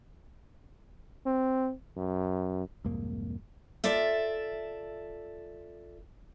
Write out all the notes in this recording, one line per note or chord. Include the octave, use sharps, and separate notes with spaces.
C4
F#2
C2 F2 G#2 A#3
F4 A4 D5 E5